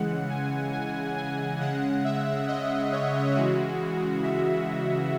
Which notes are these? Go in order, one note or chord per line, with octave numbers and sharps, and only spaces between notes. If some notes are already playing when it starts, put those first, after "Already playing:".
Already playing: C#3 E3 G#3 F#5
G#5
G#5
G#5
C#3 G#3 F#5
E5
D#5
C#5
C#3 E3 G#3 F#4
E5